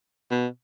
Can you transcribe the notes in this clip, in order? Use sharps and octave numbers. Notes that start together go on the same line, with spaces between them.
B2